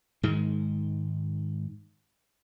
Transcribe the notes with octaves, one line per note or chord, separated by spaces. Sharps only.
G#2 D#3 G#3